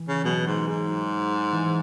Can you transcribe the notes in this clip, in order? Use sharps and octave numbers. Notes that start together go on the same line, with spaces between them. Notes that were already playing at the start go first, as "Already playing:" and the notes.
Already playing: E3
C#3
B2 F#3
G#2
G#2
F#3
E3